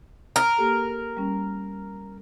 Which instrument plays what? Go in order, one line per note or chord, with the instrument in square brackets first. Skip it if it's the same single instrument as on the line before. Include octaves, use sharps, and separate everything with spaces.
[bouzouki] A#4
[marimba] A#3 G4 A4
G3 C#4